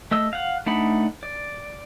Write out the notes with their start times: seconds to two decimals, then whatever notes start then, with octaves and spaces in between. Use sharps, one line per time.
0.11 A3 D#5 E6
0.33 F5 F#5
0.66 A3 D4 D#4 F#5 B5
1.23 D5